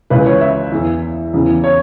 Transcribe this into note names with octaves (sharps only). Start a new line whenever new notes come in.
C#2 C#3 E3 B4
C#5
E5
E2 E3
E2 C#3 E3
C#5